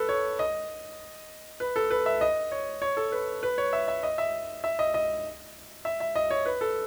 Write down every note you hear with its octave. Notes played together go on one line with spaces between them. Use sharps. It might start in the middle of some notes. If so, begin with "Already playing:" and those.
Already playing: A4 B4
C#5
D#5
B4
A4
B4
E5
D#5
C#5
C#5
A4
B4
B4
C#5
E5
E5
D#5
E5
E5
D#5
D#5
E5
E5
D#5
C#5
B4
A4